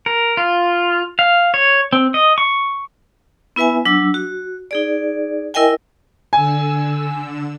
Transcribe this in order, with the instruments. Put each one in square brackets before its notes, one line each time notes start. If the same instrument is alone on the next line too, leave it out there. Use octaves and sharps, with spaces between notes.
[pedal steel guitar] A#4
F4
F5
C#5
C4
D#5
C#6
[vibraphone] B3 E4 B4 E5 G#5
F#3 D4 E6
F#4
D#4 G#4 D5
E4 A#4 D#5 E5 G5 G#5
[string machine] D3 E6 [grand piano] G#5